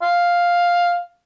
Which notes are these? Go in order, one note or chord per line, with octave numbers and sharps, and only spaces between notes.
F5